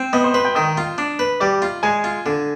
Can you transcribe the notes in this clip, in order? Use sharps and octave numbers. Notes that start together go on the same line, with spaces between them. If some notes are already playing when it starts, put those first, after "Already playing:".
Already playing: C4
B3 D#5 D#6
C5 C6
B4 C5 C6
G5 G6
D#3 D#5 D#6
F4
D4
B4
G3 D5 D6
F4
G#3 G#5 G#6
F4
D3